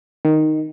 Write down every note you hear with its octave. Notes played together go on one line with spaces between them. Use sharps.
D#3